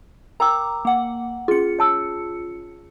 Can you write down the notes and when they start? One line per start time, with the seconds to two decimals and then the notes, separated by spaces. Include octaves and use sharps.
0.40 A#4 G5 A#5 D6 E6
0.85 A#3 F#5
1.48 C#4 F4 G#4 C#7
1.79 C#5 A5 E6